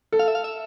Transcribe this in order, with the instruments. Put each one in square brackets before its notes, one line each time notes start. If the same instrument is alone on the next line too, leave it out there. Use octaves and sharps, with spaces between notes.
[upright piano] A4
[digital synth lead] F5
E5
F5
E5